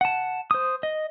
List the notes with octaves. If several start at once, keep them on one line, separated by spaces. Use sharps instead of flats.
F#5 A5
C5 D#6
D#5